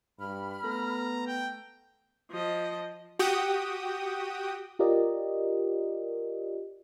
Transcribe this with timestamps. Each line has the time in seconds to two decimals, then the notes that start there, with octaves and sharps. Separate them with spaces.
0.19 G2 B5 F6
0.64 A3 B3 A#5
1.27 G5
2.31 F3 D#5
3.19 F#4 G4 G5 D#6
4.79 F4 G4 A#4 D5 D#5